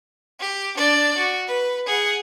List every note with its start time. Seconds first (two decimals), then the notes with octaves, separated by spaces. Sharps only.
0.40 G4
0.77 D4 D5
1.18 F#4
1.48 B4
1.86 G#4 F#5